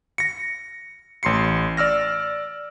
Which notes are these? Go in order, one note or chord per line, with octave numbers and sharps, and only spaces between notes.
A#6 C#7
A1 C6 C7 C#7
D5 E6 F6 A#6